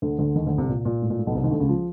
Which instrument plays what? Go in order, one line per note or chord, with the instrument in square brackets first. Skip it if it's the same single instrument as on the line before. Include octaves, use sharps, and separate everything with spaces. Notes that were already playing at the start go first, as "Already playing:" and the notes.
[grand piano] D2 D3
D2 D3
D#2 D#3
D2 D3
C2 C3
A#2
A#2
A2
A#2
A2
B1 B2
C2 C3
D#2 D#3
D2 D3
C#2 C#3
F3